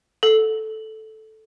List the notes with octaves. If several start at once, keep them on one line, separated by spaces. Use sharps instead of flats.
A4